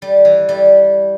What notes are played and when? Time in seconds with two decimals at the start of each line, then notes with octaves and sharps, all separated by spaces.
0.02 G3
0.25 E3
0.49 G3